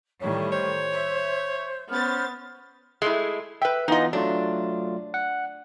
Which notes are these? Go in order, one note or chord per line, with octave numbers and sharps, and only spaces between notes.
A2 D#3 G3 C#5
C5 C#5
E5
B3 C#4 C5 F6 A6
G#3 A3 E4
B4 E5 G5
E3 B3 D#4 F4 D#5
F#3 A3 D4 F4
F#5